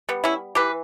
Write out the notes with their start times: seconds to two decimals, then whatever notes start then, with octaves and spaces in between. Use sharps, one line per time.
0.09 G3 B3
0.24 C#4 E4
0.55 E3 G4 B4